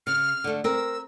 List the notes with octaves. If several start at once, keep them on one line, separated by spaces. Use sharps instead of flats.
C#3 F6
D3 A3
C4 A#4 E6